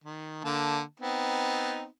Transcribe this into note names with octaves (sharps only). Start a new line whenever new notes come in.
D#3
D3 A#3 A5
B3 C4 D#4